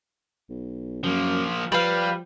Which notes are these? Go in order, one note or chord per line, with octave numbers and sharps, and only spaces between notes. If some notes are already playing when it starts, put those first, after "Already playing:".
B1
F#2 F3 A#3
F3 G3 B4 F5